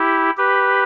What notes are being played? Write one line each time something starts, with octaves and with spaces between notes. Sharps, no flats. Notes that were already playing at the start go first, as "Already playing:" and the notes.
Already playing: E4 G4
G4 B4